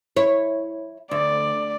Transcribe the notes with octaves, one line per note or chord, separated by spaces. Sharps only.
E4 C#5
D2 D5